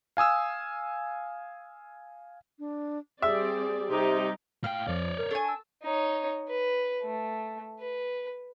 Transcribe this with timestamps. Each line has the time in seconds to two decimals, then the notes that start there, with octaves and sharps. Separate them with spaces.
0.17 F5 G#5 D#6 E6
2.59 D4
3.22 G3 C4 G#4 D5 E5
3.90 C3 G3 D#4 G4
4.64 A2 F5 G5 F6
4.87 F2 F3 C#5 D5
5.18 A#4
5.31 D4 A4 G#5 C#6
5.44 A5 E6
5.83 D#4 C#5
6.48 B4
7.02 A3
7.80 B4